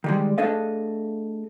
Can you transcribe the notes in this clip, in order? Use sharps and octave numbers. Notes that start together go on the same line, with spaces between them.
D#3 G3 G#3
A3 D4 G#4 A4 D#5 F5